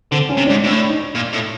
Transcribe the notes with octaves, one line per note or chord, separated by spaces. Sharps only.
D3 C4
C#4
C3
G#2 D4
A2 D4
D#4
A#2
A2